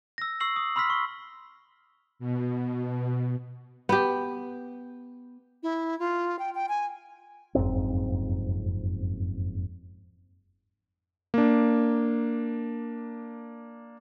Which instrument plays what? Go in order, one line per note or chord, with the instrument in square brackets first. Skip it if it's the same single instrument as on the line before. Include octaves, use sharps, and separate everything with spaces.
[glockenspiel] E6 A#6
C#6 E6 C7 F#7
D#6
B5 C6 E6 F6 B6
C#6
[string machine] B2
[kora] B3 G4
[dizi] E4
F4
G5
G5
G#5
[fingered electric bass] F#1 F2 G#2 C4
[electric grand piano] A#3 D4